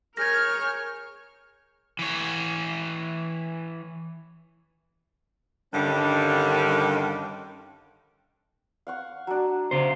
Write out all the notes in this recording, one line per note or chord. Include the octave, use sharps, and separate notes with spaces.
G#4 A#4 C#5 F6 G6 G#6 A#6
E3 C#5
G2 D3 D#3 G3 C#4
F5 F#5 C#6
F#3 D4
C#3 C5